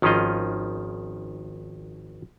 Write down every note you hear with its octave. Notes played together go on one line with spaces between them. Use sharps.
G#1 D#3 F3 C#4 F4 D#5